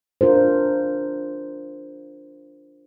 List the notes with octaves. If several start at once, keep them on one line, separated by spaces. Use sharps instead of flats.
D4 F4 A#4 C5